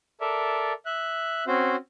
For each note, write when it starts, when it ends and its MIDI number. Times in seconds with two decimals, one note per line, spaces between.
0.21 0.73 69
0.21 0.73 70
0.21 0.73 74
0.21 0.73 76
0.86 1.44 76
0.86 1.44 90
1.47 1.76 60
1.47 1.76 61
1.47 1.76 66
1.47 1.76 72